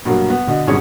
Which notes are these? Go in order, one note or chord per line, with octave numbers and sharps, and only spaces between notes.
G2 B2 F#3 A#3
B3
B2 D3 D#5
G#1 G2 B2 C#4 G#4 C#5